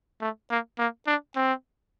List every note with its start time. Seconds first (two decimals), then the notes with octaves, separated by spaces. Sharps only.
0.21 A3
0.50 A#3
0.79 A#3
1.07 D4
1.36 C4